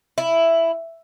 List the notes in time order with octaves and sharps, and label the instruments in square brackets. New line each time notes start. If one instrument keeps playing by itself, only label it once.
[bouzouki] E4